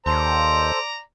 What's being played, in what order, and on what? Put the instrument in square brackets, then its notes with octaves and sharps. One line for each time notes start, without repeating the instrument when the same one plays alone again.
[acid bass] D#2 [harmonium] A4 C5 [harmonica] D5 A#5